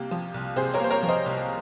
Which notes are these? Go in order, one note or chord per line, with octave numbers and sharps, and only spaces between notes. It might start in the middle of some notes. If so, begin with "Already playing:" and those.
Already playing: C2 C3 A#3 G4
F3
C2
C3 G#4 C5
A#4 C#5
A#3 C5
A#4 C#5
F3
C5 D#5
C2